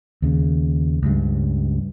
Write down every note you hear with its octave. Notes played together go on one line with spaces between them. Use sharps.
D#2 C#3
C#2 G2